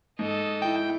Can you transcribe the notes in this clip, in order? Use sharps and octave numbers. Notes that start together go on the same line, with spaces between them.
G#2 A4 D#5
E4 G5